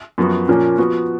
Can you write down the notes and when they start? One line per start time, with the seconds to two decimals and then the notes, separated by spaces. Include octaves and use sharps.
0.18 F#2 F3 B3 F#4
0.48 A#2 F3 A#3 C#4
0.78 F3 B3 F#4